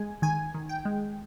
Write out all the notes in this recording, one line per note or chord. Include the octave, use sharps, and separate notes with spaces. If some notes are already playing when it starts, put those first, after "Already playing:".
Already playing: G#3 G#5
D#3 G#5
D#3
G5
G#3